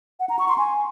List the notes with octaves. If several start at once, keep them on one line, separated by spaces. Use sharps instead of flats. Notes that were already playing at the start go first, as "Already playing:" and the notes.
F#5
A#5
C#6
C6
G#5